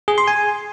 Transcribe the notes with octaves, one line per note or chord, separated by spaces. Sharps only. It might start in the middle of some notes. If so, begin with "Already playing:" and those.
G#4
C6
G#5